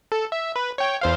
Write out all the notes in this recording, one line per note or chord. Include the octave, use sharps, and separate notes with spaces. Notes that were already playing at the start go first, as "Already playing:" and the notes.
A4
E5
B4
C#5 G5
E2 C5 F5